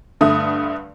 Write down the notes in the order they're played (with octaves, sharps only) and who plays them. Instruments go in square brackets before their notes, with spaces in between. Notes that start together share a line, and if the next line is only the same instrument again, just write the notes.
[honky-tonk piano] G2 D3 A3 D#6